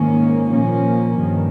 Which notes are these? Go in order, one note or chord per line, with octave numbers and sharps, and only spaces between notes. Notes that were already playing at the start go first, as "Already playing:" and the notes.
Already playing: G#2 D#3 A#3 C#4
A#2 F3 A#3 C#4
G2 D#3